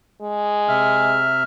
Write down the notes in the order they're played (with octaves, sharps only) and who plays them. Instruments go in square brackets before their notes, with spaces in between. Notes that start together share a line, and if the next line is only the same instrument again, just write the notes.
[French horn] G#3
[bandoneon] C3 E5 F6